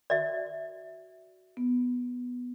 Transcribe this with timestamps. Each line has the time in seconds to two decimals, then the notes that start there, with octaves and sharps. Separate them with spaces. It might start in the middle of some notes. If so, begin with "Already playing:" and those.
0.10 F#4 D5 E5
1.57 B3